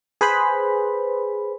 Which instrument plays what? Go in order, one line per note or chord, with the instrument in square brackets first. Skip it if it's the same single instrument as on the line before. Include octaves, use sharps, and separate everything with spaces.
[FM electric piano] G#4 B4 C5 B5